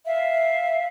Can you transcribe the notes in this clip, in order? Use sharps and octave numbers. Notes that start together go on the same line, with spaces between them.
E5 F5